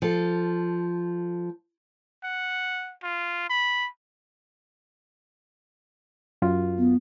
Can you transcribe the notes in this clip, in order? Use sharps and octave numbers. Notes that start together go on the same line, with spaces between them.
F3 A4
F#5
F4
B5
F#2 F4
B3